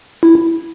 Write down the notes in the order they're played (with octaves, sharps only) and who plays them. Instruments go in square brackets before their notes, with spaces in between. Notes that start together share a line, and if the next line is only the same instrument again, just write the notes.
[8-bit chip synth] E4